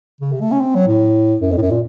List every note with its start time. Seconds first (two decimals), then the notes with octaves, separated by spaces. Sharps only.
0.21 C#3
0.32 C3
0.41 A3
0.52 C#4
0.61 C4
0.75 F#3
0.87 A2
1.41 F#2
1.51 F2
1.57 A2
1.61 F#2
1.71 A#2